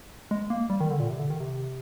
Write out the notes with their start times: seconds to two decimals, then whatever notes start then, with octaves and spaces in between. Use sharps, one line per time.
0.31 G#3
0.50 A#3
0.70 G3
0.80 D#3
0.91 D3
1.00 A#2
1.10 C3
1.19 D3
1.30 D#3
1.40 C3